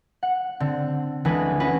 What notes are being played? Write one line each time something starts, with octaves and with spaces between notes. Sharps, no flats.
F#5
D3 C4
D2 E3 G#3 B4 G#5
C#4 F#4 B4